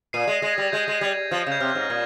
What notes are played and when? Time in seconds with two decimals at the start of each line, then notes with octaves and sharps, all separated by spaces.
0.13 A#2 C7 D#7
0.27 G#3
0.33 A#6
0.42 G#3
0.48 A#6
0.53 G3 G#6
0.72 G#3 G6
0.88 G#3
1.01 G3 G#6
1.31 F3
1.46 C#3
1.52 G6
1.60 C3 F6
1.75 G#2
1.81 A#6
1.90 A#2 G#6